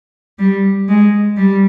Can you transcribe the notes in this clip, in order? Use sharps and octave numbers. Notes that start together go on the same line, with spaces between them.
G3
G#3
G3